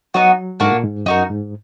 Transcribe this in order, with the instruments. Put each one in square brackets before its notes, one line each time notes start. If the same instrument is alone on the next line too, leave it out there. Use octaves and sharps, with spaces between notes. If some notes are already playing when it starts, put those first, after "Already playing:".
[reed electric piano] F#3 [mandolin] B3 D#4 F#4
[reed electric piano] G#2 [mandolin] A#3 D4 F#4
[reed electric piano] A#2
G#2
[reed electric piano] F#2 [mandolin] D#4 F#4 A#4
[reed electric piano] G#2